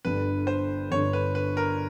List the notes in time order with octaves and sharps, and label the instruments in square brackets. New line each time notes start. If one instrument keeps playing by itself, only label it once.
[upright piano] G1 G2 D3 [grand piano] B4
[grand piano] C5
[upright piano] G1 G2 D3 [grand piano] C#5
[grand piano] B4
B4
A#4